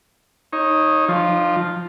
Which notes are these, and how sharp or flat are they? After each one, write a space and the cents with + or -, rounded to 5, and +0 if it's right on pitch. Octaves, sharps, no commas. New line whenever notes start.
D#4 +10 C#5 -20
F3 +0 D#4 -45